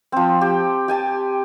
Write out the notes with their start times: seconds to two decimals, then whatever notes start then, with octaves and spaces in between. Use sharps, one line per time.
0.12 F3 C4
0.41 G4
0.88 G4 G#5 A5